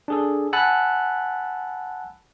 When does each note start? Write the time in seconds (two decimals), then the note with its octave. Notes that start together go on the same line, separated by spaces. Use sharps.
0.08 D4 G#4 A4
0.53 F#5 G#5 A5 B5 E6 F#6